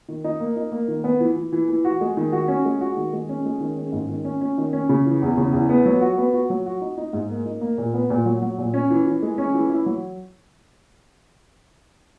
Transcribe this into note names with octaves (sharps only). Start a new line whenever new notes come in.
D#3
D#4
A#3
D#4
A#3
D#3
B3
E3
E3
E3
E3
F#4
G#3
D#3
F#4
C#4
G#3
F#4
D#3
G#3
C#4
G#3
D#3
C#4
G#2
D#3
C#4
C#4
D#3
C#4
C#3
E3
E2
C#3
E2
B3
F#3
F#4
B3
F#4
F#3
F#4
D#4
D#4
G#2
A#3
D#4
A#3
A#2
B3
A#2
F#3
F#3
A#2
C#4
E3
E3
G#3
C#4
E3
E4
F#3